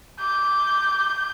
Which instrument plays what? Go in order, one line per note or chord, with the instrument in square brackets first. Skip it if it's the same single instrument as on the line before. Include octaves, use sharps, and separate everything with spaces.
[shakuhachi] D6 [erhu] G6